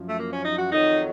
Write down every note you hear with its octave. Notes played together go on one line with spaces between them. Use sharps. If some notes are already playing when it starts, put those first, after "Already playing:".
Already playing: F#2 F3
A3
A#3
C#4
D#4
F#4
F2 D#3 F#3 D#4